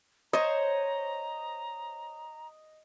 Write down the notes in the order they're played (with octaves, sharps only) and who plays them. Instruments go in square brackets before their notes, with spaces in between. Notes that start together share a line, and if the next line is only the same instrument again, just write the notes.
[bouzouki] C5 C#5 [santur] D#5 [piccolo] A#5